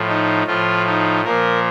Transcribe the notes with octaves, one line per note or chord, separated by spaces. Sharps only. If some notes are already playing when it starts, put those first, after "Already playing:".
Already playing: A2 F3
D#4
A2 F3 F4
D#4
A#2 F3 A#4